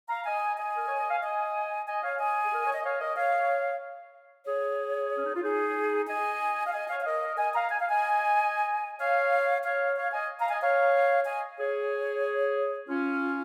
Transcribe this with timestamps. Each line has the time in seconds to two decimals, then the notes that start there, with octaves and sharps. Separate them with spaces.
0.09 F5 A#5
0.26 D#5 G#5
0.58 D#5 G#5
0.76 A#4
0.87 C#5
0.99 D#5
1.10 F5
1.22 D#5 G#5
1.87 D#5 G#5
2.03 C#5 F5
2.20 D#5 G#5
2.44 G#4
2.54 A#4
2.65 C#5
2.75 D#5
2.85 C#5 F5
3.01 A#4 D#5
3.16 C#5 F5
4.47 G#4 C#5
5.16 C#4
5.26 D#4
5.35 F4
5.43 D#4 G#4
6.08 D#5 G#5
6.67 F5
6.73 D#5 G#5
6.89 C#5 F5
7.01 F5
7.06 A#4 D#5
7.37 D#5 G#5
7.54 F5 A#5
7.70 G#5
7.81 F5
7.90 D#5 G#5
9.00 C#5 F5
9.64 C#5 F5
9.97 C#5 F5
10.13 D#5 G#5
10.40 F5 A#5
10.51 D#5 G#5
10.62 C#5 F5
11.26 D#5 G#5
11.59 G#4 C#5
12.89 C#4 F4